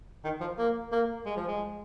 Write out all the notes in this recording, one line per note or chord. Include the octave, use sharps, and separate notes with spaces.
D#3
F3
A#3
A#3
G#3
F3
G#3